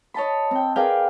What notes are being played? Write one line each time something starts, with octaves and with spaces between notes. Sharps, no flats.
C#5 D#5 A5 B5
C4 G5
G#4 A#4 B4 D5 F5 G5